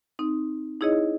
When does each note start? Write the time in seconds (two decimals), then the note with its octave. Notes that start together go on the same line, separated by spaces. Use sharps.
0.19 C4 D#4
0.81 D#4 E4 G#4 C#5 D#5